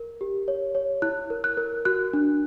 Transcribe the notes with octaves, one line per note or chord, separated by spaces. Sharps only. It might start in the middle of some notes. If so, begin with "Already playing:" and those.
Already playing: A#4
G4
C#5
C#5
E4 F#6
A#4
F#6
A#4
F#4 F#6
D4